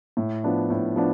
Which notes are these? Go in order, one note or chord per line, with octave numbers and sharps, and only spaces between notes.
A2
F3 B3 D4
A2
F3 B3 D4